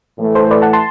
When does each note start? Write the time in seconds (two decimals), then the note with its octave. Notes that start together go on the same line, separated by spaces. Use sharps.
0.19 A2 E3 A3
0.35 A4 C5
0.51 B4 D5
0.62 F#5 A5
0.73 A5 C6